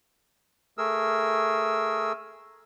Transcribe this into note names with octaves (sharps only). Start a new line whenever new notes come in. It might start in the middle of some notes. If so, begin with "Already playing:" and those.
A3 G#4 A#4 E6